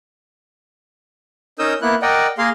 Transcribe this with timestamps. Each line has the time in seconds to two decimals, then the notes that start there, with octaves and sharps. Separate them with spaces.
1.59 C#4 D#4 A#4 D#6 E6 G6
1.82 A#3 B3 E4 F#6
2.02 A#4 D5 D#5 F#5 G5
2.38 A#3 G#4 A#4 F5 C6